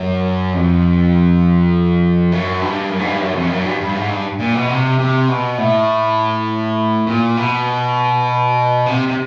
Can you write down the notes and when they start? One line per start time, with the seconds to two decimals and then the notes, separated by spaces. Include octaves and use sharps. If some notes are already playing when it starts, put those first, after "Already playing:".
Already playing: F#2
0.53 F2
2.32 F#2
2.62 G2
2.90 F#2
3.00 G#2
3.06 G2
3.21 F#2
3.36 F2
3.50 F#2
3.65 G2
3.80 G2
3.95 G#2
4.09 G2
4.39 A#2
4.55 B2
4.69 C3
4.99 C3
5.29 B2
5.58 A2
7.06 A#2
7.37 B2
8.86 C3
9.08 C3